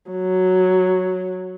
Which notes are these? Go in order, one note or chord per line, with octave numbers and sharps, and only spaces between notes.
F#3